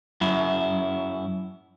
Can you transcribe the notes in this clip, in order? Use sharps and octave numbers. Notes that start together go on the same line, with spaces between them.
F#2 E4